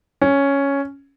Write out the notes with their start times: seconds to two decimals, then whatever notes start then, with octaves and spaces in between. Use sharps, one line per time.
0.21 C#4